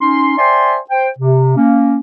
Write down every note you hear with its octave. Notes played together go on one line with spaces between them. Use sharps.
C#4 D#4 C6
C5 D5 E5 G5 G#5 C6
C5 G5
C3
A#3 C#4